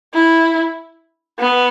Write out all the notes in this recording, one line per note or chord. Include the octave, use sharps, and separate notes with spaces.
E4
B3